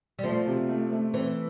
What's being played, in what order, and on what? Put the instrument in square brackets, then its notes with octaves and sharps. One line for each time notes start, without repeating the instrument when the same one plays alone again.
[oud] G3
[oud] F3 [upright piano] A3
[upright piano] C3
A3
A3
[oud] E3 [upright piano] C4